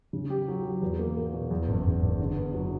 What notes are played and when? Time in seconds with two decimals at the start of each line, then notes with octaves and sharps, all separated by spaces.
0.13 C#3
0.30 G4
0.48 F#3
0.64 F#3
0.82 E2
0.99 A#3
1.17 A#3
1.34 B2
1.51 E2
1.68 F#1
1.85 F#1
2.02 F#1
2.19 D3
2.37 B3
2.54 F#3